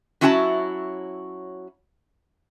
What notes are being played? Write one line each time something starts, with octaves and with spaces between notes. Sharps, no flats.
F#3 C#4 E4 F#4 F#5 A5